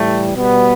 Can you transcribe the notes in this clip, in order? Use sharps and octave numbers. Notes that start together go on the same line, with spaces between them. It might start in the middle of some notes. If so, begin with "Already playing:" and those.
Already playing: A2 E3 G3 A3
B2 G3 B3